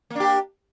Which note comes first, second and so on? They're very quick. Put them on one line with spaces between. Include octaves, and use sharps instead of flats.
A#3 D4 G4